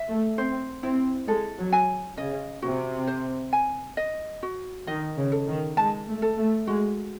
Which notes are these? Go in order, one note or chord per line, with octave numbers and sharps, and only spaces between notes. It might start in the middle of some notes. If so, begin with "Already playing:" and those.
Already playing: E5
A3
C4 C5
C4 E4
G#3 A4
F#3
G#5
C#3 D#5
C3 F#4
C5
G#5
D#5
F#4
D#3 D#5
C#3
A4
D#3
G#3 A5
A3
A4
A3
G#3 F#4